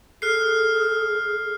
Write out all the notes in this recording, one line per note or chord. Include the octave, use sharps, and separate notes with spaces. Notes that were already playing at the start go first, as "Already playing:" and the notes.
G#4 A4 F6 F#6 C7